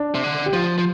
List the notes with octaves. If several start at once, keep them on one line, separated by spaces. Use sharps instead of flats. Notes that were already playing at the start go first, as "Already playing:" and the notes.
Already playing: D4
C3
D3
G4
F3 F4
F3